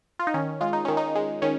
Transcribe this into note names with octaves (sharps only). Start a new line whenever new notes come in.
F4
D#4
D#3 C#4
G#3 F4
D#4
D#3 C#4
D#4
G#3
D#3 C#4